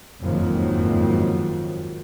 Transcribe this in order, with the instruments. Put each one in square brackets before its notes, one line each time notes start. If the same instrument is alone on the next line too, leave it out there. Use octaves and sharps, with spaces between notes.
[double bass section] F#1 F2 G#2 D#3 F3 F#3